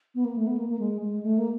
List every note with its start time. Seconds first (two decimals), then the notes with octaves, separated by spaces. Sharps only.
0.15 B3
0.25 A#3
0.36 A3
0.47 B3
0.57 A#3
0.69 A#3
0.79 G#3
1.01 G#3
1.23 A3
1.38 A#3